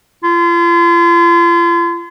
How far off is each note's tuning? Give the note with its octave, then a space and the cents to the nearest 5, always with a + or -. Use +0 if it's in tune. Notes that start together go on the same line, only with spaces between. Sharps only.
F4 -35